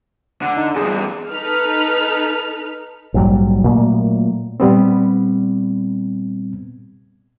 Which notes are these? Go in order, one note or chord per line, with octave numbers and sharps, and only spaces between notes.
D3 F#5
D#4
E2 G2 G#4
D#4 A4 B4 F6
A#1 G#2 F#3 G3
A#2 F#3 A3 A#3
A#2 G3 B3 C4